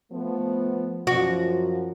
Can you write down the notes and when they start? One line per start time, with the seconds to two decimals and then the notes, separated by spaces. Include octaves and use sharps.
0.12 F3 A3 B3
1.07 F#2 F3 F#4